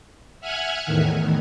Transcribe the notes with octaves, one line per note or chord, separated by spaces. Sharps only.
E5 F#5 G#5 F6 F#6 G#6
E2 A2 D#3